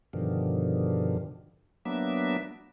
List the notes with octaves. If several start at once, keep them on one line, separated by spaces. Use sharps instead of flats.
G2 B2 D3 D#3 F3
F#3 A#3 B3 D4 E5